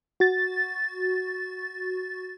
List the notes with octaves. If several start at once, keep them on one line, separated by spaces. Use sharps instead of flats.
F#4 A6